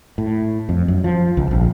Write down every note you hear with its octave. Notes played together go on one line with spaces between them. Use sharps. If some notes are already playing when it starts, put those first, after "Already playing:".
A2
F2
F#2
F3
C#2
A#1